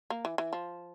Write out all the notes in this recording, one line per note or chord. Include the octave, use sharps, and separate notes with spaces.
A#3
E3
E3
F3